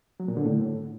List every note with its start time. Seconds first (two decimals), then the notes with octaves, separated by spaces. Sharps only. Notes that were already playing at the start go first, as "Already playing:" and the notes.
0.20 F#3
0.28 A#2
0.37 D3
0.45 A2